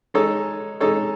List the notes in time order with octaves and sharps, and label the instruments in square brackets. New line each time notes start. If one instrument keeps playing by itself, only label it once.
[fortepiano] G#3 D#4 A4 C#5
G#3 D#4 A4 C#5